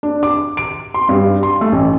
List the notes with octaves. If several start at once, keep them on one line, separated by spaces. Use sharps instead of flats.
D4
D6
D7
C6
G2
C6
A3
A1